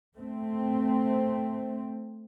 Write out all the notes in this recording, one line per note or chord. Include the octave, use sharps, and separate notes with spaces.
A3 C4